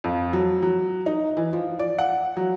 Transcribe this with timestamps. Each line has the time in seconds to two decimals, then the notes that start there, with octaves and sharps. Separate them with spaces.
0.04 F2
0.33 F#3
0.63 F#3
1.06 D#4
1.37 E3
1.53 F3
1.79 D5
1.98 F#5
2.37 F#3